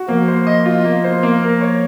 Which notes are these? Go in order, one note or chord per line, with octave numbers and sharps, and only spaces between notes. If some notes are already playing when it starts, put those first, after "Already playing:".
Already playing: F#4
F3 A#3
C5
D#5
F4
A#3
C5
A#3
A#4
C#5